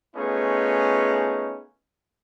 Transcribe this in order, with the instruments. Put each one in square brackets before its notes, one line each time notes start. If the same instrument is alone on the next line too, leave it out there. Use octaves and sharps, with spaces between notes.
[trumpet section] A3 B3 C#4 D#4 F4 G#4